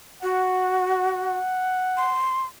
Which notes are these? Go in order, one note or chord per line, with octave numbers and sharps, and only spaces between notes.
F#4 F#5
C6